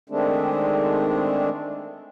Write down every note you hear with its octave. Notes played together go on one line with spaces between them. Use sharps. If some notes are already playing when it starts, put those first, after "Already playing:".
D#3 G#3 A3 C4 D4